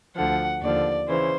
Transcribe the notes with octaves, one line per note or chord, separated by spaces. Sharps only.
D2 D3 F3 F#5
D#2 D3 F3 D5
C#3 E3 C5